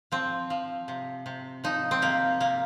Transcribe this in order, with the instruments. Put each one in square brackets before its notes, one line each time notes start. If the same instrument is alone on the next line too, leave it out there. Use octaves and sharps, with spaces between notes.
[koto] F3 C4
F3
C3
C3
F3 D#4
C4
C3 A#3
C3 A#3